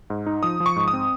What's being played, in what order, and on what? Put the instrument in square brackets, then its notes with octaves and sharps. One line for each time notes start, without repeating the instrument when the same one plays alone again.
[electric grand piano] G#2
D#4
F3 D#6
F3
C#6
G#2
D#6
C4